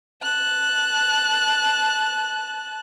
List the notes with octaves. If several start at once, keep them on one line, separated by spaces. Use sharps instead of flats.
A5 F#6